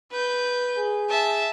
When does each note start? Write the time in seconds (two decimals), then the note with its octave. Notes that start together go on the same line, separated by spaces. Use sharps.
0.11 B4 G6
0.78 G#4
1.10 E5 A5